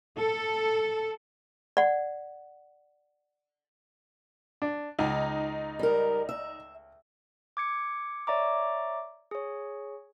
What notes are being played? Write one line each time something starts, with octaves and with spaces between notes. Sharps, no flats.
A4
D5 F#5
D4
C#2 D#4
G3 A#4
E5
D6 G#6 C#7
C#5 D5 E5 A#5 D6
G#4 C#5